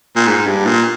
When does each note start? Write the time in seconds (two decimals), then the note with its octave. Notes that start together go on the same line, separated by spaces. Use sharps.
0.16 A#2
0.27 G#2
0.46 G2
0.66 A#2